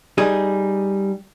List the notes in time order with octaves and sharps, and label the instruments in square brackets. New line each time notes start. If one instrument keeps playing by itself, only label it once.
[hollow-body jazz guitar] G3 D#4 G#4